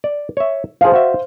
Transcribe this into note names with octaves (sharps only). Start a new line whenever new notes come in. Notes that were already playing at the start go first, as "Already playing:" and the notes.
D5
C#5 E5
F3 G#4 C5 F5
F#4 E5